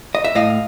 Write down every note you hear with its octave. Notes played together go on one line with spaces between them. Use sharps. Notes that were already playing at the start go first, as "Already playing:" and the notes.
D#5
E5
A2 D#5 F5